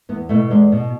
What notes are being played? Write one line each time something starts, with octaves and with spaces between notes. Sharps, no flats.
E2 B3
B2 A3
E2 G#3
B2